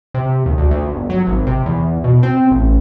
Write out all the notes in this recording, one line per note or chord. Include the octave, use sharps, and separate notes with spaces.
C3
D#2
D2
D2
G1
F#3
G#1
C3
E2
B2
C4
A1